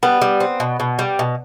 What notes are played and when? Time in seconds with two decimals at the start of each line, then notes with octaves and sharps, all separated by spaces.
0.03 G3 B3
0.21 G3
0.40 C4
0.60 B2
0.80 B2
0.99 G3
1.19 B2